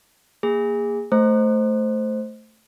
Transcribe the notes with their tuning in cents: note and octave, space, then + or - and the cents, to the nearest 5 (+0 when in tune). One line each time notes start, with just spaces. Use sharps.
A#3 +0 G#4 -25
A3 +0 C5 +0